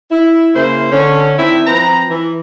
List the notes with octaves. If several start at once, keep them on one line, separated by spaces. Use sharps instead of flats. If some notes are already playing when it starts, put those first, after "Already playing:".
E4
C#3 A#3 E4 C5
D3 C#4
D#3 C4 D4 E4
F3 C4 B4 A#5
E3